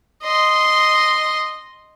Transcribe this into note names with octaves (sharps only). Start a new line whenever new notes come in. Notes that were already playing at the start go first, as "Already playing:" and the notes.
D#5 C6